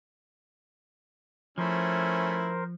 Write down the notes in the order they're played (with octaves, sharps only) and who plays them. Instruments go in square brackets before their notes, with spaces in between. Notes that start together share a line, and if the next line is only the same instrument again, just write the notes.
[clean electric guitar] F3 [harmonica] A3 C#4 E4 [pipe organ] A#4 C5